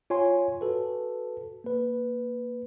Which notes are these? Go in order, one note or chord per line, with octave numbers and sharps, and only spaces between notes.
F4 C#5 G#5 C6
F#4 A4 B4
A#3 B4